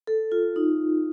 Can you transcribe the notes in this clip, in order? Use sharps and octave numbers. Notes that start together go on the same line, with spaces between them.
A4
F4
D#4